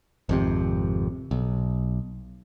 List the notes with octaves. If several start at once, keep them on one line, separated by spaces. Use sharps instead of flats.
G#1 F2 C3
B1